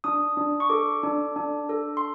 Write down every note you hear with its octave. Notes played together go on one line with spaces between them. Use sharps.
D4 D#6
D4
C#6
A4 D6
D4
D4
A4
C6